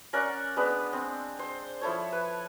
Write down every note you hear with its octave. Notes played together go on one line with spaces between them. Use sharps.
C#4 A#4 D5 F#5
G#3 B3 D4 B4
C4
C5
F3 E4 A4 C#5
B4